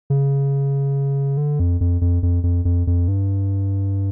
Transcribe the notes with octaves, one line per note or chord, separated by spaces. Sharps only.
C#3
D3
F2
F2
F2
F2
F2
F2
F2
G2